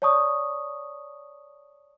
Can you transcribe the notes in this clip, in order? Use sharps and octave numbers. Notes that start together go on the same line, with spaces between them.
C#5 D5 A5 C#6 D#6